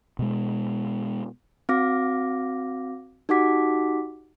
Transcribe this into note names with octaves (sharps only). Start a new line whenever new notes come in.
B2 G#3
C4 F#4 F5 D6 A#6
D#4 F#4 G4 F#5 D6 B6